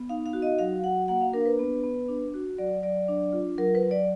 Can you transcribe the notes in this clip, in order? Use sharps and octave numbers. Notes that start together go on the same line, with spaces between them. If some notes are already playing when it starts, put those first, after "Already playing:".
Already playing: B3
D#4 F5
F5
F#4
D#5
F#3 F5
F#4 F#5
A#3 F#5
F5
D4 A#4
B4
B3
B3
D4
F#4
F#3 D5
F#3 D5
D4
F4
F#3 A#4
B4
F#3
D5